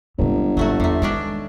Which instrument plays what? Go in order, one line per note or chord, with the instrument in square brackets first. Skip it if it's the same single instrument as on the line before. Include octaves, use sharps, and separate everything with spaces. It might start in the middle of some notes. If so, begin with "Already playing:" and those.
[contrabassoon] G1 [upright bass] G#2 C3
[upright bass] G#1 E4 [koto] F#3 A3 F#4
[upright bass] E2 [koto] C3 A3
[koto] D#3 C#4 D4 [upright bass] G#3